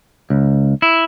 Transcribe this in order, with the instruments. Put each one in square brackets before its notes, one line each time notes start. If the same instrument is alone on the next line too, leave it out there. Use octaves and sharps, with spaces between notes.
[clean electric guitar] C#2
E4